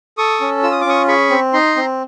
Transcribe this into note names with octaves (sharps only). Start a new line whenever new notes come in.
A4 C#6 D#6
C#4
F4 E6
D#6
D6
C#4 C#6 D#6
G#4 B5 C#6
C4
D#4 A#5 C6
C4